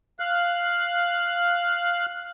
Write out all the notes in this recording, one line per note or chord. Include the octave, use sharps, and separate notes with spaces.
F5 F#6